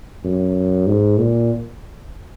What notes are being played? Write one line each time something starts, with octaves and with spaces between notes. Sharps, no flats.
F#2
G#2
A#2